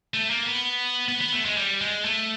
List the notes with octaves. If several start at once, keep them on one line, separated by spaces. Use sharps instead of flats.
A3
A#3
B3
B3
B3
A3
G#3
G3
G#3
A3